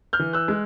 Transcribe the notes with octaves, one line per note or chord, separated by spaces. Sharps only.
F6 G6
E3
E6 F#6
G#3